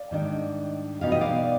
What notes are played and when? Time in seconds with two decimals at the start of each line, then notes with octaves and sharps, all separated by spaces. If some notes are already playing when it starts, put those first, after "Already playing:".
Already playing: D5 F5
0.11 G#2 D#3 G3 D4
1.01 B2 G3 B3 D#4 F5
1.12 D#5
1.21 D5 F5